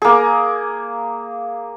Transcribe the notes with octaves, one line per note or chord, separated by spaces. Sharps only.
A#3 G#4